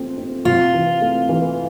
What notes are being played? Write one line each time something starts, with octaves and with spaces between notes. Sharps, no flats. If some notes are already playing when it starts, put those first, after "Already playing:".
Already playing: F3 A3 C4
C4
C3 F4
E3
A3
E3